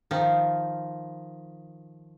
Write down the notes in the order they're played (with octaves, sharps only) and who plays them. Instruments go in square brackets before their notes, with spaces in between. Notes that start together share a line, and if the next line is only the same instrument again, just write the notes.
[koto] D#3 F3